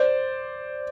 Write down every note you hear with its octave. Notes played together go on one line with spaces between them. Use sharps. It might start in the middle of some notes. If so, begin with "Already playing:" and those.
Already playing: C5 D5